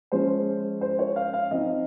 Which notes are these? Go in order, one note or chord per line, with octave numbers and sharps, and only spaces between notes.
F3 G#3 C#4 F4 C5
C5
C#5
F5
F5
F3 C4 D#4 D#5